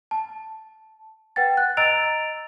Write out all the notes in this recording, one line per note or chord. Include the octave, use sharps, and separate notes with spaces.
A5
B4 F#5 G5 A6
F#6
D#5 A#5 E6 A6 D7 F7